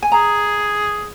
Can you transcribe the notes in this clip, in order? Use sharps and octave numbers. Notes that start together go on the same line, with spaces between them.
G#5
G#4 A#5